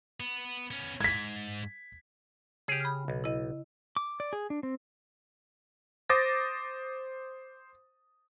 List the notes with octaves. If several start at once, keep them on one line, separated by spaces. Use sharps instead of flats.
B3
B3 C#4
G#2 G#6 B6
C#3 G4 G#4
B5 F6
B1
E4 D#5
D6
D5
G#4
D4
C4
C5 D6 D#6 A6 A#6